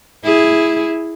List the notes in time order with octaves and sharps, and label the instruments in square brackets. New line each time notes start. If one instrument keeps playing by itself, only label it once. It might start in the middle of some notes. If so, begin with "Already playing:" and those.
[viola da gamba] E4 G#4